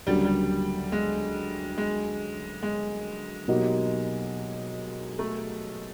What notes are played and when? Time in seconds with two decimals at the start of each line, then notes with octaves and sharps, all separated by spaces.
0.07 D2 C#3 F#3 G3 A#3
0.25 G3
0.92 G#3
1.78 G#3
2.63 G#3
3.48 B2 F#3 A#3 D#4 G4
5.19 A3